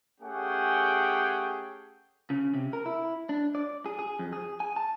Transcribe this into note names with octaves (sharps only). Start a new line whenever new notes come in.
A3 C#4 G4 G#4 F#5 G5
C#3
C3
A#4
E4
D4
D5
G#4
G#4
F2
G#4
G#5
A5